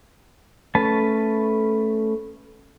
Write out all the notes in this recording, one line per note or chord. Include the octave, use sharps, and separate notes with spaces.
A3 C#4 B4 A5